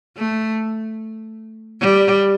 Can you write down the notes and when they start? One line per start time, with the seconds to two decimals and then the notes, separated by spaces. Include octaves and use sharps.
0.17 A3
1.80 G3